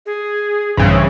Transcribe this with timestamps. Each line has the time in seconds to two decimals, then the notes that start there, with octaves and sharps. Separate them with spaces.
0.06 G#4
0.77 A#1 G2 C#3 E3 C4